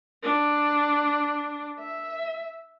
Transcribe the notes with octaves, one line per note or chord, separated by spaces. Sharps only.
D4
E5